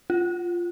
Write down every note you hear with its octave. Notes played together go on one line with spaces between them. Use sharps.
F4